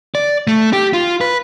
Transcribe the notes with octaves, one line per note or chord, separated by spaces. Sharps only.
D5
A3
G4
F4
B4